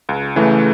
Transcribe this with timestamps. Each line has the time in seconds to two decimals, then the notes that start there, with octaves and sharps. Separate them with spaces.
0.09 C#2
0.36 C#3 E3 A3